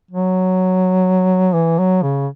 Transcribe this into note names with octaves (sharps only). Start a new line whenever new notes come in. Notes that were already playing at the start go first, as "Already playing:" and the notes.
F#3
E3
F#3
C#3